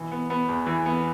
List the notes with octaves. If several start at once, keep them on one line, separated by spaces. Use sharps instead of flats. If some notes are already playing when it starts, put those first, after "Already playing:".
Already playing: B2 E3
B3
B3
E2
E3
B3